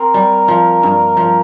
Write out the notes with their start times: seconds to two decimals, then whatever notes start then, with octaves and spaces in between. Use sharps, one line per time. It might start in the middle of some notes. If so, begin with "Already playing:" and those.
Already playing: C4 A#4
0.14 G3
0.48 F3
0.83 G2
1.17 F3